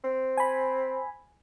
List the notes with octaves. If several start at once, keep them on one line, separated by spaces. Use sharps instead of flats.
C4
G#5 B5